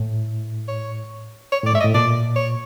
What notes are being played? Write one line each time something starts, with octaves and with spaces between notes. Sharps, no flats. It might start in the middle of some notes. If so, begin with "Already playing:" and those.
Already playing: A2
C#5
C#5
A2
D5
G#2 E5
D#5
A2
A#2 D5
C#5